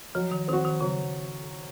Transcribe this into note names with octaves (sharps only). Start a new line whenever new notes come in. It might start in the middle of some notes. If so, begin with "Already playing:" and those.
F3 F#3
D#3
D#3 C4 F#4
D#3
C#3 F#3